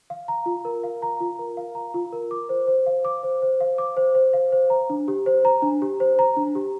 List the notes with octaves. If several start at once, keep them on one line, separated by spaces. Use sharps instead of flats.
F5
A#5
F4
A#4
F5
A#5
F4
A#4
F5
A#5
F4
A#4
D6
C5
C5
F5
D6
C5
C5
F5
D6
C5
C5
F5
C5
A#5
D4
G4
C5
A#5
D4
G4
C5
A#5
D4
G4